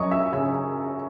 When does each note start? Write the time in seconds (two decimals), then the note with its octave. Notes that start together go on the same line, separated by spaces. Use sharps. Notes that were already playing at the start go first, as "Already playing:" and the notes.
Already playing: F#2 F#3 C#5 D#5 C#6 D#6
0.11 E5 E6
0.33 C#3 E5 E6